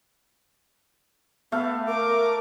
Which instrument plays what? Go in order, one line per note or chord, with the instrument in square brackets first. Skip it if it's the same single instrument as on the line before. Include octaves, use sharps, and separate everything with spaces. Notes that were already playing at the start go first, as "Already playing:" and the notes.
[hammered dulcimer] A3 F5 [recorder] B3
[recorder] A#4 [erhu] D6